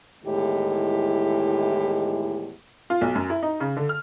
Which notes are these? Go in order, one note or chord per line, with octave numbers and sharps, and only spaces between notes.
E2 A2 D#3 G#3 E4 G4
F4
B1
F#2
E4
D#4
C#3
D3
F6